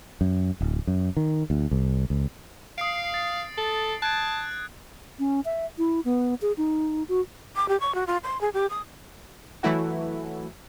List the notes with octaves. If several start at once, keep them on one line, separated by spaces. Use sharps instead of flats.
F#2
D1
F#2
D#3
D2
C2
C#2
F5 D#6 C7 D7
A6
A4
A5 F#6 G#6 D7
C#4
E5
E4
B3
G#4
D#4
F#4
D6
G4
C#6
F#4
F4
C6
G#4
G4
D#6
E3 F#3 A3 E4 F#4